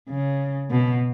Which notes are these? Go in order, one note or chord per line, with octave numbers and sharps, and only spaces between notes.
C#3
B2